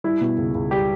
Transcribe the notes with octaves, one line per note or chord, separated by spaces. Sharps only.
G3 E4
B2
C#2
C#2
G3 G4